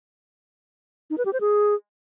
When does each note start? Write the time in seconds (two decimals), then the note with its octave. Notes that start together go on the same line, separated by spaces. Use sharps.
1.10 D#4
1.18 B4
1.26 G4
1.33 C5
1.41 G#4